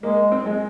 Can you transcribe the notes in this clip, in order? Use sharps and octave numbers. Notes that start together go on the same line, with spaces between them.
G#3 A#3
C4
G#3